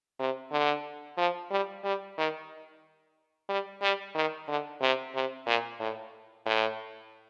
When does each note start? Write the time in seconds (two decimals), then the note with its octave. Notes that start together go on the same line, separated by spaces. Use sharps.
0.19 C3
0.52 D3
1.17 F3
1.51 G3
1.84 G3
2.18 D#3
3.49 G3
3.82 G3
4.15 D#3
4.48 D3
4.81 C3
5.14 C3
5.46 A#2
5.80 A2
6.46 A2